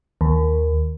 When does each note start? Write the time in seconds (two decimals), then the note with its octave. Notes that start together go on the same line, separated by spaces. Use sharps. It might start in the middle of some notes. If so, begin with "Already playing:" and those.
0.21 D#2